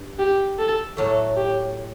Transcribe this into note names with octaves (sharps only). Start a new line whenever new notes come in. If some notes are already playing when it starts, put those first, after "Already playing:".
Already playing: G2
G4
A4
A2 F#3 A3 A4
G4